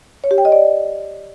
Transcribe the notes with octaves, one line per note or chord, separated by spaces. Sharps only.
C#5
G4
G5
D#5
D5